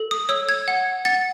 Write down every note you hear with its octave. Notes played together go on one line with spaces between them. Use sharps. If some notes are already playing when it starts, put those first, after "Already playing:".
Already playing: A4
D#6
C#5 E6
G#6
F#5
F#5 A6